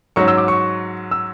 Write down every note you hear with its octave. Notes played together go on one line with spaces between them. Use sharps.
G#2 F#3 C#4 C#6
E6
D6
C#6
E6